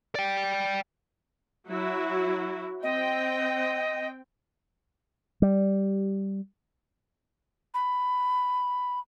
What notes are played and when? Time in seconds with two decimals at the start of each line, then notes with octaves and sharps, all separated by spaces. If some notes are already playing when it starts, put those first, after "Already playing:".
0.15 D5 G5
1.68 F#3 E4 F#4
2.83 C4 D#5 G5
5.42 G3
7.74 B5